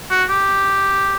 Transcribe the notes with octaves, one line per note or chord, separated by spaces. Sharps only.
F#4
G4